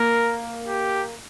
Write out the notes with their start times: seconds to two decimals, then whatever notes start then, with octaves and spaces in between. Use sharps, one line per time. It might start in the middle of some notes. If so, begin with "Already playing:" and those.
Already playing: A#3 A#4
0.68 G4